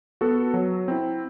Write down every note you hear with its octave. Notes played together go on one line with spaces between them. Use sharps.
B3 F#4 A4
F#3
C4 E4